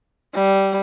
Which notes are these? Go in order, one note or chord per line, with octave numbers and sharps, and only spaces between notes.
G3